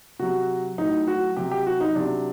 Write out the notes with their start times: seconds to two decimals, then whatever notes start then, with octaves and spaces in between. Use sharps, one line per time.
0.19 C3 F#3 F#4
0.78 A2 F#3 D#4
1.07 F#4
1.36 C3 F#3 G4
1.51 G4
1.66 F#4
1.81 D#4
1.95 C3 F#3 D4